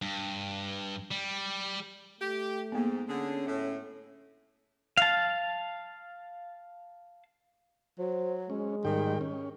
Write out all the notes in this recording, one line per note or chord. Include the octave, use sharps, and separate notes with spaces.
G2
G3
A3 G4
G#2 A#3 B3
D3 C#4 G#4
A2
F5 A5
F#3 C5
G#3 C#4
G#2 D#3 G3 G5
C#4